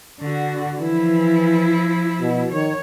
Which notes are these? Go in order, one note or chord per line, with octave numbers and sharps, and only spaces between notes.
D3 F#4
E3 F3 E4
B2
D#3 C#5